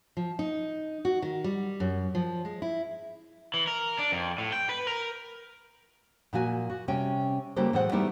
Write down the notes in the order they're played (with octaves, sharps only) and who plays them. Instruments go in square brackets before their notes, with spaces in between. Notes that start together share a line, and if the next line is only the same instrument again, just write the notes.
[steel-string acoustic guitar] F3
D#4
F#4
D#3
G3
F#2
F3
G#3
E4
[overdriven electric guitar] E3
A#4
D4
F2
A2
G5
B4
A#4
[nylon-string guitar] A#2 F3 F4 F#4 G#5
F#4
C3 G3 C#4 G5
C#3 G3 A#3 F#4 A4 C5
A2 E3 G#3 C5 F#5
G3 A3 B3 D#4 E4 G4